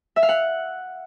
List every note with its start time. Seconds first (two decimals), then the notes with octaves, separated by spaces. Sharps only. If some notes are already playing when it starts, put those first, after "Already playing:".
0.16 E5
0.22 F5
0.29 F#5